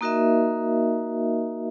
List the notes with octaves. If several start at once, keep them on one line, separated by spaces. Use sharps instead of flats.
A#3 D#4 F#4 A#4 D#5 E5